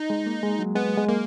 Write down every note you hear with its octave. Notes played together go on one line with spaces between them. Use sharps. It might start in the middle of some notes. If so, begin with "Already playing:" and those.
Already playing: D#4
G#3
A#3
G#3
F#3
G#3 B3
G#3
A#3